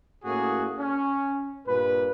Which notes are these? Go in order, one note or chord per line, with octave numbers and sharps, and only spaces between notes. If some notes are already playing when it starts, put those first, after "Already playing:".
A2 A#3 C#4 F#4 G#4
C#4
G2 A#2 B4